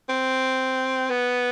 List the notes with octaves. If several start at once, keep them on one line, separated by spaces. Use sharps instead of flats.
C4
B3